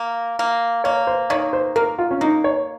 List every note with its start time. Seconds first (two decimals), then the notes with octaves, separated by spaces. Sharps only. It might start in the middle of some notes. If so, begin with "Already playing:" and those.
Already playing: A#3
0.39 A#3
0.84 A#3 C#5
1.07 C5
1.30 D#3 C#5
1.53 C5
1.76 A#3 A#4
1.98 F4
2.11 C#4
2.21 A#3 D#4
2.44 C#5